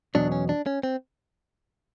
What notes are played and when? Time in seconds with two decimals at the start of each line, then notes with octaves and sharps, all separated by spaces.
0.15 E2 B2 F#3 D4
0.32 C#4
0.49 D4
0.66 C#4
0.83 C4